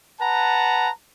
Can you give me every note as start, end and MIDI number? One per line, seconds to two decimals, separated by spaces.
0.20 0.89 71
0.20 0.89 78
0.20 0.89 81
0.20 0.89 82